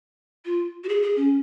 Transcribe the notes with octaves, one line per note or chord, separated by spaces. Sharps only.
F4
F#4
G#4
G#4
C#4